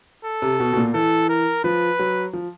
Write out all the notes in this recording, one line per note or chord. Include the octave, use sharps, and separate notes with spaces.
A4
C3
B2
B2
A#2
E3 A4
A#4
F3 B4
F#3
F3